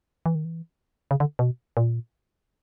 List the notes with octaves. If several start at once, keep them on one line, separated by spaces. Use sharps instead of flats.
E3
D#3
E3
C#3
D3
B2
A#2